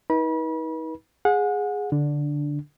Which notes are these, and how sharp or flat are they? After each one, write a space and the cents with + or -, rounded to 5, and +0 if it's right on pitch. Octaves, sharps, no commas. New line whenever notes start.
D#4 +40 B4 -35 B5 -35
G#4 -5 F#5 -30
D3 -10 D4 +0